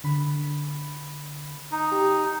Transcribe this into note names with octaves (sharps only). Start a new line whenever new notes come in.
D3 B5
D#4
G4